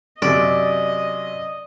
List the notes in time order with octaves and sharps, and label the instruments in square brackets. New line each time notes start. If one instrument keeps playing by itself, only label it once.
[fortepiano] F#2 C3 [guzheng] D5 [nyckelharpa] D#5